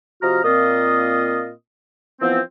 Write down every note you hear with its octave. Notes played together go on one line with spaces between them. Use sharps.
C3 F3 F#4 D#5 A#5 F6
A#2 A#3 C4 F4 D#5 D#6
E3 F3 B3 C4